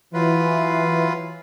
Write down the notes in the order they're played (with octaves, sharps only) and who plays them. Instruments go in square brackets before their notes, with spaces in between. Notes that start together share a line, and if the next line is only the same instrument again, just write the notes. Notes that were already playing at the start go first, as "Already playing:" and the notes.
[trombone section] E3 [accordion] F#3 F4 B4